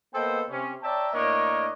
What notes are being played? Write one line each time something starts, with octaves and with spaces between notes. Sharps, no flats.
A#3 B3 A4 C5 D#5 G5
C3 C#4
C#5 D5 E5 G5 A5 A#5
A2 A#3 D4 A#4 C#5 D#5